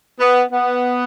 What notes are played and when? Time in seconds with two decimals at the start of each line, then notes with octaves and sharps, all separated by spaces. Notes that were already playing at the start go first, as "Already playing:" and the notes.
0.19 B3
0.52 B3